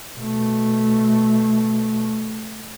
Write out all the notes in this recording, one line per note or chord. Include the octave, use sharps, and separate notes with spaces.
B2 A3